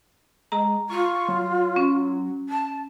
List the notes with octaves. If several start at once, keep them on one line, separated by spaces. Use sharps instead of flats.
G#3 A#5
F4 C#6
F#3
C#4
A5